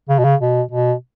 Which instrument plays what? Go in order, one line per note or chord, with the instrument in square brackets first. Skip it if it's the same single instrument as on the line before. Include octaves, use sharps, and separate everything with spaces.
[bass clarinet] C#3
B2
C#3
B2
B2